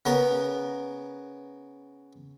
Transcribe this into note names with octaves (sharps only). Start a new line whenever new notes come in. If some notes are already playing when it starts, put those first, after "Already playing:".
C#3 B3 A#4